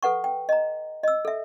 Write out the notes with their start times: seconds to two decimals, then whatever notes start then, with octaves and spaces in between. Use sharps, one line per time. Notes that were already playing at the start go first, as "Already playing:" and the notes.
0.03 A4 B4 F#5 C#6
0.24 G5
0.49 D#5 A#5
1.03 D#5 E6
1.25 A4 E5